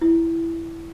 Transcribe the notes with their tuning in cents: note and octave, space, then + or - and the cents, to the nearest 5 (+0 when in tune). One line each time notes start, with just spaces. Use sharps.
E4 +5